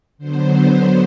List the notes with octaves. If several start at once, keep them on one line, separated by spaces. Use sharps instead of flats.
D3 F#3 B3 C5